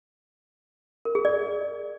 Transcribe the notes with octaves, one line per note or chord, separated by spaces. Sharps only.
A#4
G#4
D5